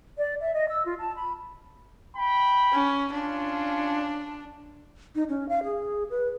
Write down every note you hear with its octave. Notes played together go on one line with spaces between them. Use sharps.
D5
E5
D#5
E6
F4
A5
B5
G5 B5
C#4
C#4 D4 F4
D#4
C#4
F5
G#4
B4